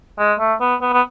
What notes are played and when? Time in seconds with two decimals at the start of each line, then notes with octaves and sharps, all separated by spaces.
0.19 G#3
0.40 A3
0.61 B3
0.82 B3
0.93 B3